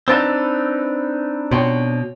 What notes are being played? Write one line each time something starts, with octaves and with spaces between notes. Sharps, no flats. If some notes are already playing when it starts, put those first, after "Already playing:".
C4 D4 D#4 B4 E6 A6
B2 C#5 G5 C6